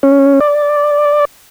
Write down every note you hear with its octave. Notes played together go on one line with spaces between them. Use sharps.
C#4
D5